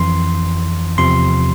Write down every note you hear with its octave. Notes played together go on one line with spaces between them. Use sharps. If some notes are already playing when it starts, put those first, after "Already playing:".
Already playing: F2 E3 C6
E2 C3 F3 C6